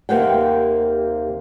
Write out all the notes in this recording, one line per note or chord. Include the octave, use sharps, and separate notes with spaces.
D#2 C3 A#3 C4 F#5 G5